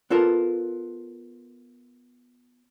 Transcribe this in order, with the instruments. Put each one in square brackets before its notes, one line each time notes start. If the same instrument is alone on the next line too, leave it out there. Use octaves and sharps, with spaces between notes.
[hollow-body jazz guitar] B3 F4 A4 A#4